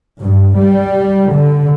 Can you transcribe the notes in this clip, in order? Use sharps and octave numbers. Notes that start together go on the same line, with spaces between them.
G2
G3
D3